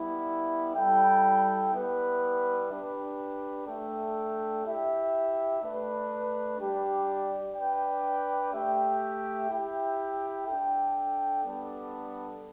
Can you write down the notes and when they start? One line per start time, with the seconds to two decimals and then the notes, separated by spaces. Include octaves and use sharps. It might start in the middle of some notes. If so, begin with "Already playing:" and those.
Already playing: G3 B3 E4
0.75 G3 E4 A4 G5
1.72 G3 B3 E4 B4
2.69 D4 G4 B4
3.67 A3 D4 A4 E5 G5
4.64 E4 G4 E5 G5
5.61 A3 D4 B4
6.58 G3 D4 G4 D5
7.55 D4 B4 D5 G5
8.53 A3 G4 E5 G5
9.49 E4 G4 E5 G5
10.46 D4 A4 G5
11.44 G3 B3 D4 A4 D5